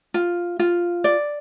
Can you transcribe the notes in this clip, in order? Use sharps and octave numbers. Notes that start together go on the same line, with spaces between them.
F4
F4
D5